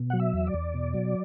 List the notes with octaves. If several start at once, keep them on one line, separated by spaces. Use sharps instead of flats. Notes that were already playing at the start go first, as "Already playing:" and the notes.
Already playing: B2
F#3 F#5
E5
E2
D5
E2
B2
F#3